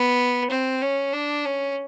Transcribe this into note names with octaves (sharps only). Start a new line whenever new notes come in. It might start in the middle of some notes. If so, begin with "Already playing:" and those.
Already playing: B3
C4
C#4
D4
C#4